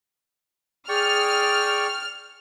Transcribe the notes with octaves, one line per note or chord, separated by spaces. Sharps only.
G#4 D5 G5 C#6 F6